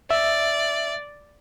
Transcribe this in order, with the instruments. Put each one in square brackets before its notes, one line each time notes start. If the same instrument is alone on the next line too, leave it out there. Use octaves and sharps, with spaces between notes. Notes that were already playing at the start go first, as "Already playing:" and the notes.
[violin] D5 [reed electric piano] E5